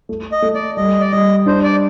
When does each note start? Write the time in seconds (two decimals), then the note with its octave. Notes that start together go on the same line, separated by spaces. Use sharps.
0.09 A3
0.32 D#5
0.42 A3
0.55 D5
0.77 G3 D#5
1.00 D5
1.11 G3 D#5
1.46 D4 C5
1.64 D5